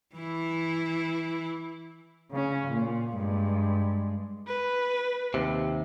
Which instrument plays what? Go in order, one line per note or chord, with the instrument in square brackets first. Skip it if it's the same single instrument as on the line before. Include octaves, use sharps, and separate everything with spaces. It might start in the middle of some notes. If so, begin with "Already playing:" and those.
[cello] E3 E4
C#3 C#4
A#2
G2 G#3
[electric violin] B4
[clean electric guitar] D#2 C3